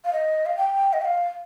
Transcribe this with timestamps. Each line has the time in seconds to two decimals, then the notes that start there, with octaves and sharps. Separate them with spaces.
0.05 F5
0.13 D#5
0.46 F5
0.57 G5
0.93 D#5
1.02 G5
1.05 F5